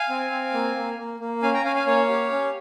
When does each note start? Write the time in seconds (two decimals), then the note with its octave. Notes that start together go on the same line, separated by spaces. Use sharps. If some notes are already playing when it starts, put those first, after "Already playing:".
Already playing: F5 G#5
0.09 C4
0.31 C4
0.53 A#3
0.76 A#3
0.98 A#3
1.20 A#3
1.42 C#4 F5 G#5
1.53 G5 A#5
1.65 C#4 F5 G#5
1.76 F5 G#5
1.87 A#3 C#5 F5
2.09 G4
2.32 C#4